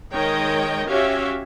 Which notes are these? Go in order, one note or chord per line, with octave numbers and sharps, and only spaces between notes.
D#3 G#3 C#5 D#5 G5
C#4 F#4 G4 C#5 E5 F5